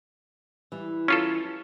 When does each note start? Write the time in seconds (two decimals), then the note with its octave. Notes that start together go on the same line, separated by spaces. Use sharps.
0.72 E3 G3
1.08 C#4 F4 A4